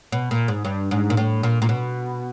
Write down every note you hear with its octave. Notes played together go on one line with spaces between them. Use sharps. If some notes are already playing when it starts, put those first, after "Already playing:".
B2
A#2
G#2
G2
G#2
A#2
A2
A#2
A#2
B2